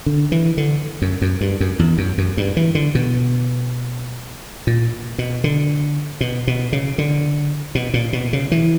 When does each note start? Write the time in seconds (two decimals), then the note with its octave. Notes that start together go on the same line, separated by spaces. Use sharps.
0.06 D3
0.32 E3
0.57 D3
1.02 F#2
1.22 F#2
1.41 G2
1.60 F#2
1.79 E2
1.98 F#2
2.18 F#2
2.37 G2
2.57 E3
2.75 D3
2.95 B2
4.67 A#2
5.18 B2
5.44 D3
6.21 B2
6.47 B2
6.73 C#3
6.98 D3
7.75 B2
7.94 A#2
8.13 B2
8.33 C#3
8.52 E3